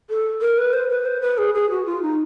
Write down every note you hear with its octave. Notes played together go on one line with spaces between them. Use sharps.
A4
A#4
B4
C5
B4
C5
B4
G#4
G#4
F#4
F4
D#4